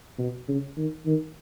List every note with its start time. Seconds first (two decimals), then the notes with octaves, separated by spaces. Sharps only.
0.19 B2
0.48 C#3
0.77 D#3
1.06 D#3